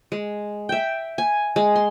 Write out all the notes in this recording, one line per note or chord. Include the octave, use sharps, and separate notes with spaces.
G#3
E5 G5
G#5
G#3
C6